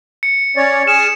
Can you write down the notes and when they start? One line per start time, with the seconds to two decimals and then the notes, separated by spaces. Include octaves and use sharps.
0.23 C#7
0.56 C#4 C#5 D5
0.87 G#4 G#5 F6 E7